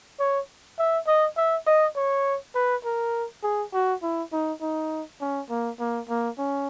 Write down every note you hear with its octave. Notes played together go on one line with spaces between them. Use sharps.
C#5
E5
D#5
E5
D#5
C#5
B4
A#4
G#4
F#4
E4
D#4
D#4
C#4
A#3
A#3
A#3
C#4